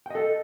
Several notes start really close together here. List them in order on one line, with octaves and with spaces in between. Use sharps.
G5 D#5 A4